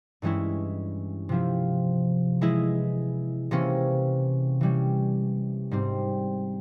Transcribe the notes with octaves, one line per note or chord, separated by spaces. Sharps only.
G2 E3 G#3 C#4 E4
C3 F3 C4 E4
E3 G#3 E4 G#4
C3 E3 A#3 C#4
E3 G3 C#4
G#2 G3 C4